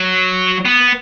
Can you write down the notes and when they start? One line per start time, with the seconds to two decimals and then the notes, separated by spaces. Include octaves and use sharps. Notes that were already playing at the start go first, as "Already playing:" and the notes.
Already playing: F#3
0.65 B3